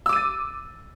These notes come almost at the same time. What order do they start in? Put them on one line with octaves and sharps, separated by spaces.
E6 D6 D#7 A6